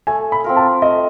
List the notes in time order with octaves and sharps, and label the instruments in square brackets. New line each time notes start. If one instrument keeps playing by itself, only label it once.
[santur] A3 [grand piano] G#5
[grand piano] B5
[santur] C4 F4 A#4
[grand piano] A5
[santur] A3 [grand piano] D#5